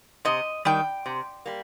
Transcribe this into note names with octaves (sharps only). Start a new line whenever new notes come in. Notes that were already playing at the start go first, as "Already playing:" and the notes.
C3 D#5
D#3 G3 G5
C3
G3 A#3